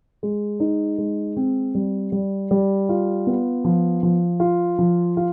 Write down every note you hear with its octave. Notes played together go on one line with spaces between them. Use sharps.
G#3
D#4
G#3
C4
G3
G3
G3
F4
B3
F3
F3
F4
F3
F4